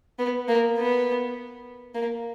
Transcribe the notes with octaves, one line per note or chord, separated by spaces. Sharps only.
B3
A#3
B3
A#3